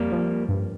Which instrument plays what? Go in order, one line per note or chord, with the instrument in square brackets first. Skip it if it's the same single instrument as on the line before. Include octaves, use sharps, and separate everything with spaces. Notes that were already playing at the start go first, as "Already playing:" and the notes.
Already playing: [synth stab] F2 [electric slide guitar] G3 A#3
[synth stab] F3
G2